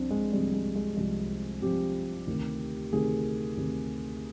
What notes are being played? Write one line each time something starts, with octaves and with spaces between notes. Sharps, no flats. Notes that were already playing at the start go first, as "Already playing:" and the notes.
Already playing: C2 C3 F3 C4 D4
G#3
C2 C3 F3 G3
G#3
G#3
C2 C3 F3 G#3
C2 C3 F3 G4
D2 C3 D#3
D2 C3 D#3 G#4
D2 C3 D#3